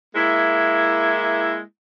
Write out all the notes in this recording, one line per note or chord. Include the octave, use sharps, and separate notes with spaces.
G#3 A#3 E4